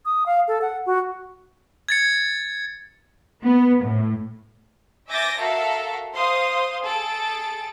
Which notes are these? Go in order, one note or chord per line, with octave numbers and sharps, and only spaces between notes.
D#6
F5
A4
F#5
F#4
G#6 A6 C#7
B3
A2
E5 G#5 D6 G6 A6 A#6
F#4 A4 A#4 E5 F5
C5 F5 C6 D#6
G#4 A4 A6 D7